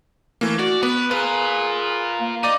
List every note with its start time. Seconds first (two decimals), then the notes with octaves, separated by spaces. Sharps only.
0.41 E3 A3 A#3
0.59 F#4 D5
0.83 B3 B4
1.11 F4 G#4 A#4 B4
2.21 A#3
2.43 D#4 D5 D6 D#7